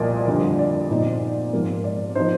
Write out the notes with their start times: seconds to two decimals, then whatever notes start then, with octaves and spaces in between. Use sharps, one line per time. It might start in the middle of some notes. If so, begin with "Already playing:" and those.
Already playing: C2 A#2 F3 A#3 D5 D#5
0.27 F2 D3 G3
0.59 D5
0.90 A#2 F3 C4 D#4
1.53 G#2 F3 A#3
1.84 D5
2.15 F3 C4 D#4 C5